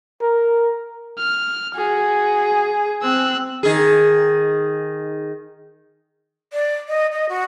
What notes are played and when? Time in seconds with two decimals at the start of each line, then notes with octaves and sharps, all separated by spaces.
0.22 A#4
1.18 F6
1.75 F#4 G#4
3.02 C4 E6 F#6
3.63 D#3 G#4
6.53 D5
6.88 D#5
7.12 D#5
7.29 F#4